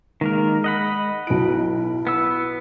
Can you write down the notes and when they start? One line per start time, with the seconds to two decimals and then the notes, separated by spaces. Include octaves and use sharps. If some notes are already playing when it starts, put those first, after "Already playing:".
0.21 D#3 G#3 A#3 A#4
0.64 D#5 F#5 B5
1.27 B1 E4 D7
2.07 B3 E6